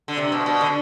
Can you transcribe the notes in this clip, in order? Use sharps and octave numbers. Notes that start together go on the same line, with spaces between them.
D3
C3
B2
B2
D3